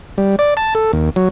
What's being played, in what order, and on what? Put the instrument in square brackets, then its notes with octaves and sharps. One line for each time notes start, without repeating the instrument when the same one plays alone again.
[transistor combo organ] G3
D5
A5
A4
D#2
F#3